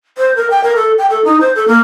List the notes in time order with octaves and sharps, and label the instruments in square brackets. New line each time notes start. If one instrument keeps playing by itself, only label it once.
[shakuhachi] C5
A#4
G5
A#4
A4
G5
A4
D#4
C5
A4
A#3